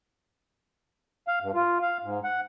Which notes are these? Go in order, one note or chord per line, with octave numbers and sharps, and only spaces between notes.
F5
G2
F4
F5
G#2
F#5